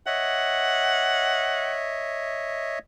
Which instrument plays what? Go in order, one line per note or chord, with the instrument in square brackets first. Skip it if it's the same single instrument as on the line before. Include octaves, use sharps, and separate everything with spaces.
[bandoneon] C#5 D#5 E5 [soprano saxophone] F#5